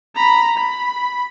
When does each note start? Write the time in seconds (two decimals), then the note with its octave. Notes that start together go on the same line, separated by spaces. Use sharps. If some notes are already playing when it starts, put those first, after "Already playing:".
0.15 A#5 B5
0.57 B5